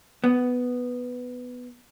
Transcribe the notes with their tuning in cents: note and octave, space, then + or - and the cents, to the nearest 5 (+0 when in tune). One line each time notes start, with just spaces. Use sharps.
B3 +5